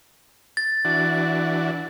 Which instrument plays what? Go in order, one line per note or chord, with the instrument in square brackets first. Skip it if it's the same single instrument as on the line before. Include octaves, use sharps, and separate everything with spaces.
[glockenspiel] A6
[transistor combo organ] E3 D4 F#4